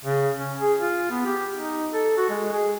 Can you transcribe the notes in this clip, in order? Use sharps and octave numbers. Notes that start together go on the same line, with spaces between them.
C#3
C#4
G#4
F4
B3
G4
D#4
A4
F#4
G#3
G#4